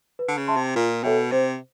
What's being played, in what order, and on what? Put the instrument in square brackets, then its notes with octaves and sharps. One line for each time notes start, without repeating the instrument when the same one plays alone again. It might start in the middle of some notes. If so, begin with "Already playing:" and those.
[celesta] B4
[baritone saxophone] D3
C#3
[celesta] E5 A5 C6
[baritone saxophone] C3
[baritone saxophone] A#2 [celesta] F4
[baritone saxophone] B2 [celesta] A4 C#5 E5 G5
[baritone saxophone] C3 [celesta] C5